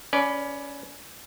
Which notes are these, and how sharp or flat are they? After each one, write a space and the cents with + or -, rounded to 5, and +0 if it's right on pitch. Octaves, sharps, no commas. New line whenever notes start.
C#4 +15 B4 +0 D5 +0